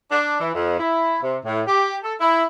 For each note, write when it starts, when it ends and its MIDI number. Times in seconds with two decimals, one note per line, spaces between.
0.11 0.38 62
0.40 0.51 52
0.54 0.77 41
0.79 1.18 64
1.23 1.38 48
1.44 1.62 45
1.67 1.97 67
2.04 2.14 69
2.20 2.44 64